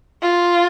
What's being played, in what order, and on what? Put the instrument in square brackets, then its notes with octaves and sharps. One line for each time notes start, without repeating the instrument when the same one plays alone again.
[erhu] F4